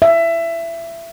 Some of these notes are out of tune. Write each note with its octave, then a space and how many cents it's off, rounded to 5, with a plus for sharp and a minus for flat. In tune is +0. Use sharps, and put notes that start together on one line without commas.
E5 +20